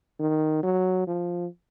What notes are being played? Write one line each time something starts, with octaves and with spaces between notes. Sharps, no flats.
D#3
F#3
F3